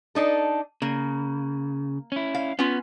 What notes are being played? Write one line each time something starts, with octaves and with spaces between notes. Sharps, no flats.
D4 D#4 A4
C#3 A#3
C#4 E4
F5
B3 C#4 F4